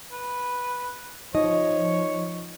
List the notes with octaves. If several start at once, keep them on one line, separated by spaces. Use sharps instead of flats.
B4
F3 D#4 C#5 D#5